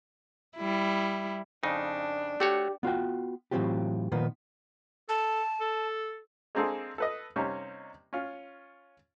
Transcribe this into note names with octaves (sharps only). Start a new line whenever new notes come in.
G3 E4
F2 C#3 D4 D#4
A3 F#4 G4 C#5
B3 F4 F#4 G5
A2 E3 F#3 C4 F4 G4
A#2 D#3 F3 A#3 B3
A4 A5
A4
G#3 A#3 C4 D4 G#4 A4
A4 B4 D#5
C3 G3 A#3 C#4 D#4
C#4 F4